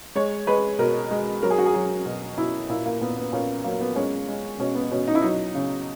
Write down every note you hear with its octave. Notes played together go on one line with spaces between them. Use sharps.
G#3 C#5
G#3 B4
B2 A#4
G#3
F#3 A#4
G#4
F#4
G#4
F#3
B2
B2 E4
A#2 E4
A#3
A#2 B3
B3
A#2 C#4
F#3 A#3
B3
G#3 C#4
G#3
B2 C#4
B3
B2 C#4
D#4
E4
F#3 D#4
C#3